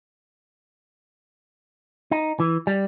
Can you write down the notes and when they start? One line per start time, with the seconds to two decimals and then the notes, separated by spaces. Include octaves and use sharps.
2.11 D#4
2.40 E3
2.67 G3